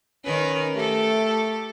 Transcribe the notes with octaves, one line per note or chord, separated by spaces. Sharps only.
D#3 C#4 A#4 B4
A3 G4 A4